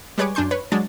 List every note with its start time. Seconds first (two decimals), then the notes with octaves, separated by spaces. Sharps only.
0.18 G3 G#3 B4 C#5 G#5 D6
0.35 F#2 D4 G#5 C6 G6
0.51 B4 C#5
0.72 F#3 G#3 D4 A6